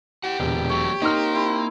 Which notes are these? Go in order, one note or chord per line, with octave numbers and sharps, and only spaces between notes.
E4 G4 F#5
E1 A#2 D3
F#3 A3 C#5
A#3 C4 D#4 A#4 C5 F6
C4 E4